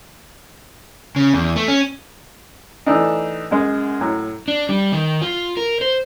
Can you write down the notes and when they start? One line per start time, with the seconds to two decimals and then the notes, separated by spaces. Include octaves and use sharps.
1.16 C#3
1.34 E2
1.56 A3
1.68 C#4
2.86 E3 A3 D4 D#4
3.51 F#2 G#3
4.01 A2 F#3
4.48 D4
4.69 G3
4.92 D#3
5.22 F4
5.57 A#4
5.81 C5